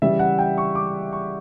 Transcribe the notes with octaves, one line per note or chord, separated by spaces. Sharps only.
C#3 E3 G3 E5
F#5
G5
C#6
D6
C#6